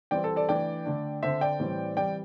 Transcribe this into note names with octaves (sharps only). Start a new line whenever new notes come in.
E3 G3 C4 D5 G5
A4
A4 D5
E3 A3 D4 D5 G5
D3 A3 D4
D3 C4 C5 E5
D5 G5
A2 E3 G3 C4
E3 G3 C4 D5 G5